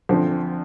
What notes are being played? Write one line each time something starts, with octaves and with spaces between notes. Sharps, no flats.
D2 D3 F3 C4